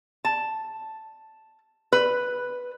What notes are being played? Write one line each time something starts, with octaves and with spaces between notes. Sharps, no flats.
A5
B4